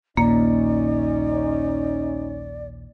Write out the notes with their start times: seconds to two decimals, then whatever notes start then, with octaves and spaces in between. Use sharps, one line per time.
0.17 A#1 D#2 A#2 A#3 C#4 D#4 D5